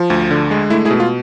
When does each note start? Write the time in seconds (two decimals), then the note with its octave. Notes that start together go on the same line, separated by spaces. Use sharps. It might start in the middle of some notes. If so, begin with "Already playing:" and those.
Already playing: F3
0.10 D2
0.31 D3
0.51 G#3
0.70 A3 E4
0.85 E4 G#4
0.91 B2
1.00 F4